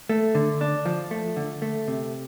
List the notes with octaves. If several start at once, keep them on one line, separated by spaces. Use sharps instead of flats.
A3
D3
D4
F3
A3
D3
A3
C3